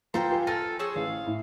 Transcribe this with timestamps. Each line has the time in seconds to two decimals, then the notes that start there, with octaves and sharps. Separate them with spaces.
0.14 F3 A4 B4 C5 F5 G5 A#5 C6
0.30 F4 G4 B4 G#5
0.47 F4 A4 G#5 F6 A#6
0.79 G#4 C5 C#5 E6
0.96 A1 F5
1.26 A2